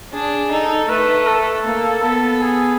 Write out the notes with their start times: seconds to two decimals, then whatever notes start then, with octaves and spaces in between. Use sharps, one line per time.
0.13 D4 G#4
0.51 D#4 A4
0.89 A3 B4
1.28 A4
1.66 A#3
2.04 B3 A4
2.42 G#4